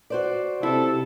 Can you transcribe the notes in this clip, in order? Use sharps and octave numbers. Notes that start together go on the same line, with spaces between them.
F#4 C5 D5
C3 E4 A4